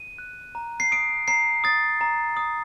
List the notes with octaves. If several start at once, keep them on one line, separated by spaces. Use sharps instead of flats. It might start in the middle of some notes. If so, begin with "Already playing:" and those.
Already playing: D#7
F#6
A#5
C7
D#6 D7
A#5 C7
D#6 A6
A#5
D#6